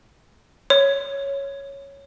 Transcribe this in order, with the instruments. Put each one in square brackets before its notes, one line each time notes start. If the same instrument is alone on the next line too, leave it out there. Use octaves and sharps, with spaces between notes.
[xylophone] C#5